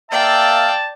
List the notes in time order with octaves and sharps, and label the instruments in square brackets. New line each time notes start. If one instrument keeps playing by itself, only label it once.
[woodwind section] A#3 E5 F5 [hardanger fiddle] D5 G5 [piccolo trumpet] A5